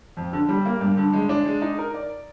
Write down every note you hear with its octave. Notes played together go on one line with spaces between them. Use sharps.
F2
D3
G3
A#3
G2
D3
G#3
D4
G#3
D#4
A#4
D5